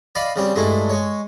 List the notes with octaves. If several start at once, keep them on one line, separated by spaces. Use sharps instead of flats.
D5 D#5 F5 B5 D6
C#3 G3 C4
G2 G#3 A3 E4
G#3 C#5